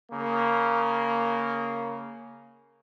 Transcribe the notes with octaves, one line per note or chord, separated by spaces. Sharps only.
C#3 A#3